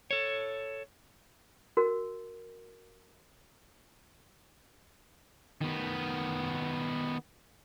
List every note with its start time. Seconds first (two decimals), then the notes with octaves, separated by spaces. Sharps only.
0.11 A4 C#5
1.77 F#4 A#4
5.61 D#3 B3